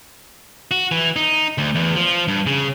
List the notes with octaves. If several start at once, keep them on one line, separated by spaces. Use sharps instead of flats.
F#4
E3
D#4
D2
E2
F3
G2
C#3